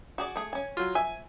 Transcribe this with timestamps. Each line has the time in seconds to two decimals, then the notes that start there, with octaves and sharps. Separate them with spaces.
0.18 F#4 G#4 D5
0.36 A3 G#4
0.53 C#4 G#5
0.77 F#3 F4
0.95 E5 G#5